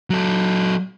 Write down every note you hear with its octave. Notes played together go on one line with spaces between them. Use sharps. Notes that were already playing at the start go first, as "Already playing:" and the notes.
F#3 A4